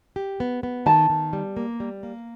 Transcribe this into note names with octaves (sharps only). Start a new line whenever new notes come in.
G4
B3
B3
D#3 A5
D#3
G3
A#3
G3
A#3